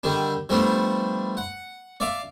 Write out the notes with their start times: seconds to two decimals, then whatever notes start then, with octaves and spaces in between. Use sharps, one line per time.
0.03 D3 D#3 G3 D4
0.49 F3 G3 A3 B3 D4
1.37 F#5
2.00 D5 E5 F5 D6